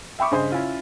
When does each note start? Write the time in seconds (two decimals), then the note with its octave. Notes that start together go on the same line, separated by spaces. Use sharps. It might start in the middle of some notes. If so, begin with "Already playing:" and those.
0.19 E5 G5 B5 C#6 D6
0.31 G2 C#3 G#4 C5 D#5
0.52 C#4 E4 F4